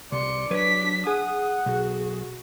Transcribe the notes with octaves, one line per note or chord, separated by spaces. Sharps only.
C2 D5 C6 C#7
F#3 D4 B4 C#5 B6
G#4 F#5 G#5 D#6
B1 F#4